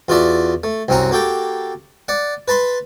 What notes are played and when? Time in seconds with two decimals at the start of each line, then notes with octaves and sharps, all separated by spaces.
0.08 E2 F4 F#4 D5 E5 A5
0.64 A3
0.88 C2 F#2 C4 C#4 F#5 A#5
1.11 A#3 F#4 G4 A4 G5
2.08 D5 F#5
2.48 B4 A5 B5 C6